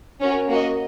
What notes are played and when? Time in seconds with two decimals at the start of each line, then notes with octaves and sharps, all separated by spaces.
0.21 C#4 F#4 A#4
0.49 A#3 F#4 D#5